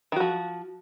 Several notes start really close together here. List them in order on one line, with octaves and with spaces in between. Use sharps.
D#3 F#4 F3